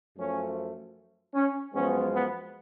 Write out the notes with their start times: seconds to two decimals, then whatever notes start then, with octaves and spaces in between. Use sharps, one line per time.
0.18 F#2 F3 A3 C#4
1.34 C#4
1.74 F#2 F3 G#3 B3 C#4
2.13 B3